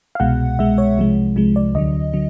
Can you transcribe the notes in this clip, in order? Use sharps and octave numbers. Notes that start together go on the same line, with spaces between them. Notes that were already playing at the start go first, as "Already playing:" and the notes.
F5
C2 B2 G#3 F#5
C2 B2 G#3 E5
C#5
C2 C3 F3 G#3
C2 C3 F3 G#3
D5
D2 D3 F#3 D#5
D3 F#3